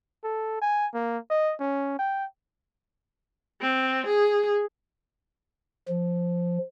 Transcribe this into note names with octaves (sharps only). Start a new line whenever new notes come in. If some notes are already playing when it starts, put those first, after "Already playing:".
A4
G#5
A#3
D#5
C#4
G5
C4
G#4
F3